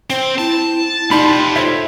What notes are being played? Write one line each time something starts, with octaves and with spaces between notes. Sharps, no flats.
C4 C5
E4 A5
D#4 F4 G4 D5 B5 C6
A4 C5 C#5 E5